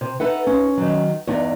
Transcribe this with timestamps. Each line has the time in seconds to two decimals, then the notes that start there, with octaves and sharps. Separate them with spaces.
0.01 C3
0.20 D#4 A4 B4 E5 F#5
0.47 C#4
0.77 D#3 F#3
1.27 E2 G2 D#4 D5